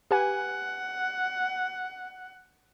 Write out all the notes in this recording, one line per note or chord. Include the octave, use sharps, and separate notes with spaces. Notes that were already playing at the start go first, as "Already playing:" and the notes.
G4 B4 F#5 G#5